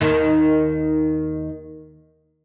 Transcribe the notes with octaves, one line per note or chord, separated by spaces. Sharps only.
D#2 D#3